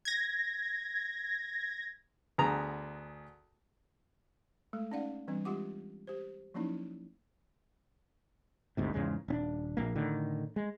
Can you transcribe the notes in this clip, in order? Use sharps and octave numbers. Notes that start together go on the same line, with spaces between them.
G#6 A#6
D2 B3 G#4 A#5
G#3 A3 A4
C#4 D#4 D5 F5 F#5
E3 G3 C4 D4
G#3 F4 G4 F#5 D6
G4 C5
F3 F#3 A#3 C#4 D#4 E4
G1 D2 G#2 C3
E2 G#2 C#3 G#3
D#1 C4 D4
A#1 A#3
A2 D3 D#3
G#3